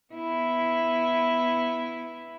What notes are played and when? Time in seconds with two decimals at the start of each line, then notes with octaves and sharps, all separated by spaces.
0.13 B3 E4